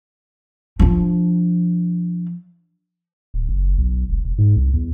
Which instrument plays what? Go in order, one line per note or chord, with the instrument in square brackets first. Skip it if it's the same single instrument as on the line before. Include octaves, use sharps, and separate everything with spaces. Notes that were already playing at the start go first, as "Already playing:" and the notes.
[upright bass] F3 D4
[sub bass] D1
F#1
B1
E1
E1
G#2
C2
E2